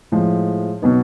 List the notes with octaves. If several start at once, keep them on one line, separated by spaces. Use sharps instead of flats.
A2 F3 G#3
B2 F#3 B3 D#4